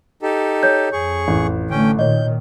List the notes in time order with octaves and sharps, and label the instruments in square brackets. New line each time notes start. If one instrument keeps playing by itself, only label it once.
[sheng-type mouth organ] D#4 G4 A4
[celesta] C#5 G6
[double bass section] F2 [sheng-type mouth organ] G#4 C#6
[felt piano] A1
[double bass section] D3 A3 [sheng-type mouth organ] C#4 G5
[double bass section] A#2 D#3 [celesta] C#5 D#5 [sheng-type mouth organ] G6